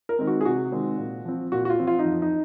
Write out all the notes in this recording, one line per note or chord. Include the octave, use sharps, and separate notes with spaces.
A#4
D#3 G#3 C4
F#4
G#4
C3 F#4
D#3 G#3 C4
A#2
F3 C4
A#2 F#4
F#4
F4
F3 C4
F4
D#4
F2
D#4